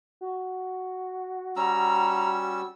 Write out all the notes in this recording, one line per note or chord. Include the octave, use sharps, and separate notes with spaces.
F#4
G3 C#4 A#5 E6